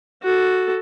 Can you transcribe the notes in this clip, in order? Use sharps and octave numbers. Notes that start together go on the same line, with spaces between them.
F#4 A4